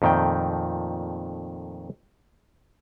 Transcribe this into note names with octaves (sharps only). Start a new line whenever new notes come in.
F2 A#2 D#3 A3 G5